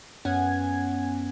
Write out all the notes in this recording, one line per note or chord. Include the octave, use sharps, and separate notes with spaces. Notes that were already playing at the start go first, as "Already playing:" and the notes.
F#2 B3 C#4 F#5 G#5 G#6